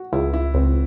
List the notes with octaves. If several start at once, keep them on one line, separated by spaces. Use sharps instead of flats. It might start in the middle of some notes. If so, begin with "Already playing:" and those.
Already playing: F#4
C#2 E4
E4
C#2 C4